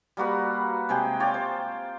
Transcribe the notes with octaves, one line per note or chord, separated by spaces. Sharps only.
G3 A#3 F#4 B4
C3 G#3 G#4 G5
F4 C#5 D5 G5
C5